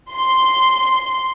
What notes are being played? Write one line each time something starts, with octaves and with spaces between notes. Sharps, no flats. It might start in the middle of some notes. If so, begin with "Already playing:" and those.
C6